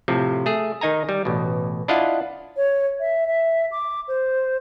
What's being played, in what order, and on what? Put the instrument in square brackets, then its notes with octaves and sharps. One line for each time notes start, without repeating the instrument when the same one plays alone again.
[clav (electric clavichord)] A2 C3 F3
A3 G#4
D#3 D#4 G#5 A#5
G3
A1 B2
D4 E4 F4 D#5 F5 F#5
[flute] C#5
E5
E5
D6
C5